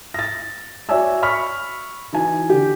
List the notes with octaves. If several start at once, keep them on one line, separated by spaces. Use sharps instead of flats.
A6 A#6
F#4 C#5 D5 E5 G#5 E6
B5 C#6 F6 B6
E3 D#4 F#4 G#5
D3 G4